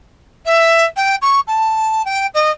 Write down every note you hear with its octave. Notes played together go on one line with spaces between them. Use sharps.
E5
G5
C#6
A5
G5
D#5